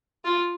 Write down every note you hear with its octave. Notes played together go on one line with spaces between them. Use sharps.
F4